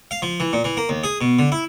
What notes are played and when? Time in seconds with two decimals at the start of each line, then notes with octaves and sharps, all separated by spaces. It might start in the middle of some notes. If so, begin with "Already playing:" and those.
0.11 F5
0.22 F3
0.40 E3
0.53 A#2
0.64 E3
0.77 A#3
0.89 D#2
1.04 G#4
1.21 B2
1.39 D3
1.52 E4